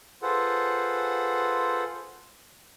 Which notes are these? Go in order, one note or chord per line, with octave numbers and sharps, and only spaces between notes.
F4 G#4 A4 B4 C5 F#5